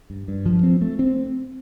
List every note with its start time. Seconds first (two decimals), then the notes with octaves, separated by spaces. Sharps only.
0.10 G2
0.28 G2
0.46 F3
0.63 C4
0.81 A3
0.99 C4